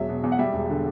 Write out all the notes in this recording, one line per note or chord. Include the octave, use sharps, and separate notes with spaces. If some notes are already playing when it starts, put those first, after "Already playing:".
Already playing: E1 F#3 E5
B2
E2
F#5
G3 E5
E1
D3